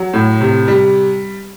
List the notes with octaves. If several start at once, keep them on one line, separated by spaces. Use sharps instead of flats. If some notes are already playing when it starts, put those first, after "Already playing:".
Already playing: F#3
A2
C3
G3